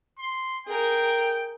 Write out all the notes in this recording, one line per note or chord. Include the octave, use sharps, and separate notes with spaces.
C6
G#4 A#4 G5